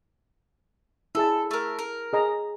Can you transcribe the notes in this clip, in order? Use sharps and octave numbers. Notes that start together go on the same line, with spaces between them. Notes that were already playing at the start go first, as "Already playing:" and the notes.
E4 G#4 A4 A5
A3 A#4
A#4
G#4 D#5 A#5